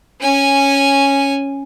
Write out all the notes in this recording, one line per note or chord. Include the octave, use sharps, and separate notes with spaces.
C#4 G#5